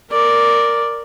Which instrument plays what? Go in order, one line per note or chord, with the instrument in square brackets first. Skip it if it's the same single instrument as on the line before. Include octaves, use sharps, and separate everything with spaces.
[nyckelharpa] A#4 D5